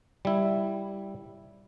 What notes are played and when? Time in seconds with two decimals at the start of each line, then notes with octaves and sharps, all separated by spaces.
0.25 G3 E4